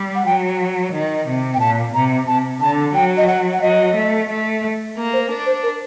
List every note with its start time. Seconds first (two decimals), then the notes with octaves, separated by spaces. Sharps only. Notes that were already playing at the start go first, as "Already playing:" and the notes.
Already playing: G3
0.15 F#5
0.25 F#3 G5
0.92 D#3
1.26 C3
1.54 G5
1.60 A#2 A5
1.94 C3 A#5
2.27 C3 A5
2.61 D3 A5
2.94 F#3 G5
3.17 D#5
3.28 F#5
3.53 F#5
3.62 F#3 D#5
3.95 A3
4.29 A3
4.96 A#3
5.13 C5
5.29 D4 A#4
5.46 C5
5.63 A#4